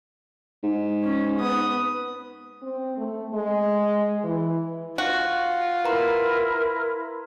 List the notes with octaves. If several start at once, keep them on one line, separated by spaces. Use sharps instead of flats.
G#2
C#4
B3 D#6
C4
A3
G#3
E3
F4 F#4
E4 A#4 B4 A#5 C6